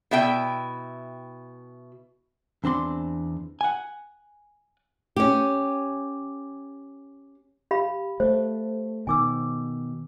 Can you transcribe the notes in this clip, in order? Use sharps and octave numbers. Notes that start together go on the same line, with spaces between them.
B2 E4 E5 G5
E2 C4 D4 C6
F#5 G#5
C#4 G4
G4 F5 B5
A3 C5
B2 D#3 G#5 D6 E6